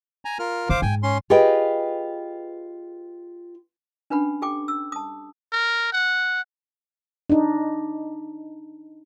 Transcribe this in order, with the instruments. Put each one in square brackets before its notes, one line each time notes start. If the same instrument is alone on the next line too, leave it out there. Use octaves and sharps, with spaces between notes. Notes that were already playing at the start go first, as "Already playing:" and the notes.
[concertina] G#5 A#5
F4 A#4 F6
[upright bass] D#3 [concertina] C5 F5 D6
[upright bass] G#2 [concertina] G5 G#5
[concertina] C#4 C6
[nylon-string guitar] F4 G4 G#4 B4 D#5 G5
[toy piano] C#4 D4 B4 F#5 B5
G4 A4 G5 D6
E6
A5 D#6
[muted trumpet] A#4
F#5
[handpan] D4 D#4